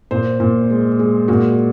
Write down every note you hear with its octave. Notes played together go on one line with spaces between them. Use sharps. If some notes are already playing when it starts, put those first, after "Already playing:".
A#2 C5
A#2
G#3
G#3
A#2 F#4